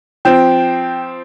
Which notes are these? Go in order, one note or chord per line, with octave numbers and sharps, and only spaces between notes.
F3 C4 G5 G6